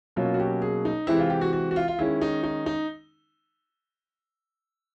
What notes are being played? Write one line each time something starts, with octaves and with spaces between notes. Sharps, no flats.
B2 F#3 A#3 C#4 F4
F#4
G4
G#4
D#4
C3 E3 G#3 C4 E4
F4
G4
F#4
F#4
F#4
F4
F4
D#3 G#3 C#4 E4
D#4
D#4
D#4